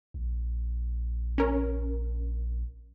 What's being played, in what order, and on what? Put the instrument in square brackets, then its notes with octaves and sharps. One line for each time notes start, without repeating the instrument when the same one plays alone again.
[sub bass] A#1
[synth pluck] C#4 A#4